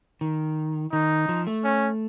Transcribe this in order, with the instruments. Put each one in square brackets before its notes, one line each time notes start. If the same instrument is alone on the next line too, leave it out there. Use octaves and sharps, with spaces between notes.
[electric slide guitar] D#3
[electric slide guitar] D#3 [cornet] D#4
[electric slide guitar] F3
A3
[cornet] C#4